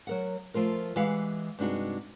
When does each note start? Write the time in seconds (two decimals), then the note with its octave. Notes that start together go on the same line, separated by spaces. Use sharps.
0.07 F#3 A#4 F#5
0.54 F3 A3 F4 A#4
0.96 E3 G#3 G4 F5 F#5
1.59 G2 C3 G#3 D4 D#4 F#4